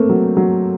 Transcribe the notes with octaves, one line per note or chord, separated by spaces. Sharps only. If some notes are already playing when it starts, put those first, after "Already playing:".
Already playing: A3 A#3 C4
F#3
F#3